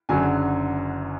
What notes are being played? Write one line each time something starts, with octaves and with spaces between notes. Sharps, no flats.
F#1 F#2 D3 F#3 G#5